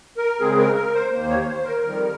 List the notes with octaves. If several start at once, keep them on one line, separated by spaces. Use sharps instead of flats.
A#4
C#3 G#3 C4 G#4
A#4
A#4
C5
D#2 D#3 A#3 C5
C#5
C#5
C5
A#4
F2 D#3 G3